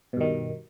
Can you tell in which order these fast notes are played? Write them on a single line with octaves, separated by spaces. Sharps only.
B2 G2 D#3